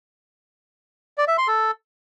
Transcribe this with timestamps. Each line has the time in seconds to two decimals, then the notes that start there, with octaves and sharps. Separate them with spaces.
1.18 D5
1.28 E5
1.38 C6
1.48 A4